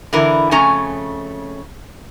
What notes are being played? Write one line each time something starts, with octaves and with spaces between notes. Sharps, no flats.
D3 E3 E4 A#4
F2 C#3 A3 C#4 G#5 A#5